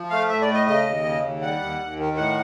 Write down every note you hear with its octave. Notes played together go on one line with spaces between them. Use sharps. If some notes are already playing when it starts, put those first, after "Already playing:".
Already playing: F3
A3 F5
A2 E5
D5
A3
D#5
C#3 D#5
D#2
C#3
D#2
G3 F#5
D#2
D#2
D#3
A2 F#5